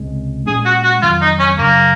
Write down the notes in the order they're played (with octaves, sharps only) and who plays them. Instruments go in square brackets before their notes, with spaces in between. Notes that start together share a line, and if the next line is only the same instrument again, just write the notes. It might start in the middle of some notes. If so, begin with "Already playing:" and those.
Already playing: [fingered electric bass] C#2 C3 G#3
[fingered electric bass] A#2 G#3 C#4 [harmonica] G#4
[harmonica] F#4
F#4
[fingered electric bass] F2 D#3 F#3 [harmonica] F4
[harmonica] D#4
C#4
[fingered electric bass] F#2 C#3 F#3 [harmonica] A#3